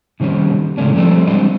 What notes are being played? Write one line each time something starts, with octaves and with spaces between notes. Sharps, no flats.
C3 D#3 G3 C4 C#4
A2 C#3 G#3 A3 C#4 D4
F3 G3 A3 C4 A4 D5
G3 G#3 C4 D4 D#5